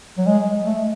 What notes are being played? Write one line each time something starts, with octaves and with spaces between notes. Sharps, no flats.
F#3
G#3
A3